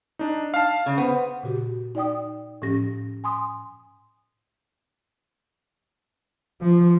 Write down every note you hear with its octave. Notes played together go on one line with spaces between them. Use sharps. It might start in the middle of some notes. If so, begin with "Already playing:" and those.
D4 D#4
F5 A5
C#3
B3 C5
A#2 C#3 F#4 G4
D#4 D5 G5 D#6
A2 F3 C#4 G4 A#6
G#5 C6 D#6
F3